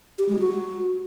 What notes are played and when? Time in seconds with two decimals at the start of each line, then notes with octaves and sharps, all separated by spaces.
0.18 G4
0.29 G#3
0.39 F#4